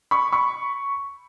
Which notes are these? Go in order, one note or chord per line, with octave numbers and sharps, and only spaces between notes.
B5 C#6
B5 C#6